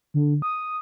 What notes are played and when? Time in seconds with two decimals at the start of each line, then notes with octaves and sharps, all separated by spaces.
0.14 D3
0.42 D#6